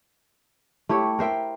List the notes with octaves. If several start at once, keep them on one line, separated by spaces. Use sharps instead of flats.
A3 E4 G4 C#5
A#4 C5 E5 G5